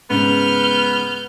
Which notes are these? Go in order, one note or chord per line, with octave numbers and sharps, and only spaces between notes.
G#2 C#3 B3 F6 G6